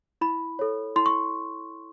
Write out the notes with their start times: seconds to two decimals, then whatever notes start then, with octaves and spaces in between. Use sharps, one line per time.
0.21 E4 B5
0.59 A4 C#5
0.96 E4 C6
1.06 C#6